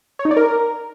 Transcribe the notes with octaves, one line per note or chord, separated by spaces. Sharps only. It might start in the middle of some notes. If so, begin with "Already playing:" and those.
C#5
D#4
D5
A#4